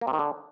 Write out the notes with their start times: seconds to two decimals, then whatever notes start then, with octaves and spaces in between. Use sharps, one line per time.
0.01 A#3
0.07 C3
0.13 D#3
0.19 D3